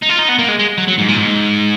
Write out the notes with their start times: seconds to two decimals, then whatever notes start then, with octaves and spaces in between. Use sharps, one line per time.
0.03 D#4
0.10 F4
0.19 D#4
0.29 B3
0.39 A#3
0.49 G#3
0.59 G#3
0.78 F#3
0.88 F#3
0.98 G#2
1.08 A#2
1.18 G#2